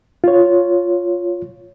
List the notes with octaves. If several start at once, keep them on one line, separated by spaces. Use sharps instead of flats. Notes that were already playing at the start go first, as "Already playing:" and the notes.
F4 C#5